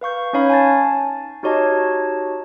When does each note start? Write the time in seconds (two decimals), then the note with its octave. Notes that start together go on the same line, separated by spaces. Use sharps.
0.01 B4 F5 C#6 G6
0.33 C#4 D#4 C#5 F5 B5 C#6
0.49 G#5 A5 A6
1.43 D#4 F#4 G4 C#5 D#5 A5